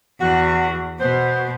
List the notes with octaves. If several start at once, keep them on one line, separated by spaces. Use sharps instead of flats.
E2 F#4
B2 B3 C5